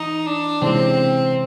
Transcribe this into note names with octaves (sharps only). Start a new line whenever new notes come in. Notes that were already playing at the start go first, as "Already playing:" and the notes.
Already playing: E3 D#4
D4
C3 E3 G#3 C4 C#4